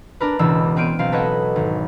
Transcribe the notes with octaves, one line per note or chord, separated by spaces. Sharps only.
D4 A#4 B4
E1 C#2 E3 D4 E6
B3 C4 G5 F6 D7 D#7
B1 C4 F5
A4 B4 C#5 D#5 F#5
G#1